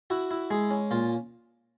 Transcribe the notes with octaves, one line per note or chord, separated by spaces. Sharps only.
E4 F#4
E4
G#3 G#4
C#4
A#2 F4